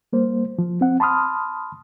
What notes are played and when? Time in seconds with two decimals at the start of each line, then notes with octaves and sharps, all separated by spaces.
0.13 G3 A#3 C5
0.59 F3
0.81 C4 F#5
1.00 A5 B5 C6 D#6 F6